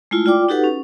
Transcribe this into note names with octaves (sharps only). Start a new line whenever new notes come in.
G#3 A3 E4 F4
F4 D5 G5 D6
D#4 F#4 G4 A4 B4 F#5
C#4